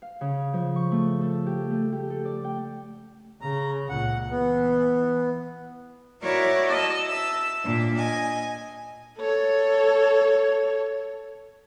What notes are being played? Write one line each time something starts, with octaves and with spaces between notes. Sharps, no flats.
F5
C#3
F3
C#6
A3
A4
G4
A3
G4
A4
D5
G5
C#3 A#5
C#2 A#2 F#5
E3 B3
E4 F#4 A#4 C#5 D5 E5
D#5 A5 E6
E5 A5 E6
A#2 D4
D#5 G#5
A4 C#5